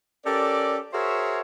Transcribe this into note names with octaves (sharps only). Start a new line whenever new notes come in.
C#4 G4 A4 A#4 D5
F#4 G#4 A#4 C5 C#5 E5